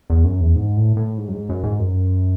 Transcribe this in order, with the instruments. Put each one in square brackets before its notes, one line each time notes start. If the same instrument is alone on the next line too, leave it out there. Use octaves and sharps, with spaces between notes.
[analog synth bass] E2
F#2
E2
G#2
A2
A2
G#2
F#2
G#2
F#2
G#2
F#2